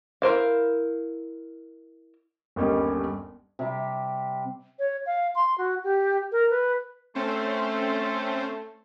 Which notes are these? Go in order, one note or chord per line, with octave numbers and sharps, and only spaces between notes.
E4 A#4 C5 F5
G1 D#2 G3 C#4 D#5
C3 G3
C#5
F5
C6
F#4
G4
A#4
B4
A3 C4 C#4 C5